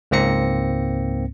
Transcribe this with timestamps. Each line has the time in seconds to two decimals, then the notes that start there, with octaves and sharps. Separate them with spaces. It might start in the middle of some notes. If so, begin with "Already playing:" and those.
0.11 C#2 G#2 A#3 C4 A#6 C#7